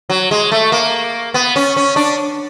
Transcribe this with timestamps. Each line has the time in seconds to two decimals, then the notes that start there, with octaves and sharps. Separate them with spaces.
0.10 F#3
0.31 G#3
0.52 A3
0.72 A#3
1.34 B3
1.56 C#4
1.77 C#4
1.96 D4